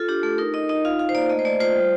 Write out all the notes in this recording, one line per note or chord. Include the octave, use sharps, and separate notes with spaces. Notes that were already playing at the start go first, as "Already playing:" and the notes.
Already playing: F4 A4
D4 G4
A3 A4
D#4 A#4
D#4 D#5
D#4 D#5
F4 F5
F4 F5
C5
A#3 D5
A3 D#5
C5
A3 D5
F4 C5
G3